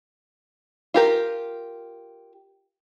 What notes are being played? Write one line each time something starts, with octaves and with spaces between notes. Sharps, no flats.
F4 G4 A#4